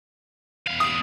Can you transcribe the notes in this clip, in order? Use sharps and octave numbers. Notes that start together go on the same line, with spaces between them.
E2 F5
D#6